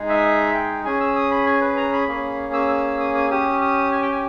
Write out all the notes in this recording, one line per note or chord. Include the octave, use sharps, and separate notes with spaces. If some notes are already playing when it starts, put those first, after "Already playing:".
Already playing: G#3 D#4 G#4
E5
G5
C#4 G#4 G#5
E6
D#6
B5
G#5
B4
A#5
B5
A#3 C#4 G#4
E6
E6
D#6
D#6
C#4 G4 D#6
D#6
G#5
G5
G#5